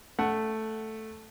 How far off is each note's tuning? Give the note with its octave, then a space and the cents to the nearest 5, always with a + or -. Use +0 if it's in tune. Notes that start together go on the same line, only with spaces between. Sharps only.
A3 +0 F#5 +5